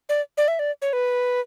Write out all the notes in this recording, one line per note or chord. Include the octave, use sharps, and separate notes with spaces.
D5
D5
E5
D5
C#5
B4